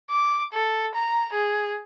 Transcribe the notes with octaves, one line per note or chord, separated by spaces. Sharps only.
D6
A4
A#5
G#4